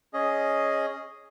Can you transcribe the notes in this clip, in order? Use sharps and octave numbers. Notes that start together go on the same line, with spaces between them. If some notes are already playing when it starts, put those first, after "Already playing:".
C#4 G#4 D#5